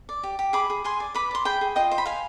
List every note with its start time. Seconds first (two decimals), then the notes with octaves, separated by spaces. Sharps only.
0.09 D5
0.23 G4
0.39 G4
0.53 G#4 B5 D6
0.70 G#4
0.84 G#4 G#5 C6
1.00 D5
1.15 B4 B5 D6
1.31 D5 C6
1.45 G#4 G5 B5
1.61 G#4
1.76 F4 D#5 G5
1.91 C5
1.98 B5
2.06 C5 F5 G#5